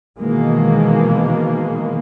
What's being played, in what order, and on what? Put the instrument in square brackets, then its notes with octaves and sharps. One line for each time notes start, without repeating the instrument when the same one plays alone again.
[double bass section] B2 D#3 E3 G#3 A#3